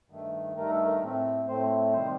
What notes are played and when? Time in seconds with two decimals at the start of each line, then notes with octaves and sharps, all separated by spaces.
0.10 G2 D#3 A3
0.56 G2 D#3 A3 A#4
0.70 A4
0.85 A#4
1.02 A2 A3 C4
1.48 A2 A3 C4 C5
1.93 C3 D#3 G3 C5